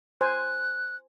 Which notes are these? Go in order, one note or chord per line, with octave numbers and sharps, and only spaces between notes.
C5 G#5 F#6